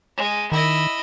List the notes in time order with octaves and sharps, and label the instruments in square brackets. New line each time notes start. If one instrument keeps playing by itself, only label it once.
[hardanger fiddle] G#3
[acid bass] D#3 [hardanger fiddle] E4 D#5